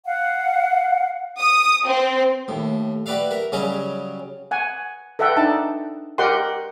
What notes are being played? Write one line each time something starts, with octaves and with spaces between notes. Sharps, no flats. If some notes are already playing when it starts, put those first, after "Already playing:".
F5 F#5
D#6
C4
D#2 A2
F#4 G4 B4 D5 E5 F5
A#4 E5
C#3 F#3 G3 C#4 G#4 D#5
F#5 G#5
A4 B4 E5 F#5 G5
D4 D#4 A5
G4 A#4 D#5 F#5 G5 C6